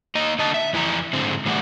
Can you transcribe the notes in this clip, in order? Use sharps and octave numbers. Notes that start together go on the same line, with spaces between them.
A#3 D#5 A#5
D3 D#5 A5
E5
F2 E3 E4 A5 A#5
G#2 D3 C4
A2 E3 G3 D#4 F#4